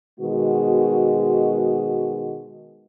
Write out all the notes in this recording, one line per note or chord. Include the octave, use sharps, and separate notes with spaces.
B2 D#3 G#3 F#4